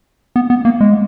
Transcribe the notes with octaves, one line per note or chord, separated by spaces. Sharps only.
B3
B3
A#3
G#3